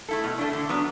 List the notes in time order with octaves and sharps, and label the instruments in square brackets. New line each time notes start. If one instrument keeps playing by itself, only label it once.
[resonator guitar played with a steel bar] A3 E4 A4
B2
A3 D4
D3
F#3 B3 D4